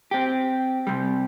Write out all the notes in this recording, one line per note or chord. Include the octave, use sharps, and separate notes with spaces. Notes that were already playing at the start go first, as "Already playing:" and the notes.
C4 G4
C3 G3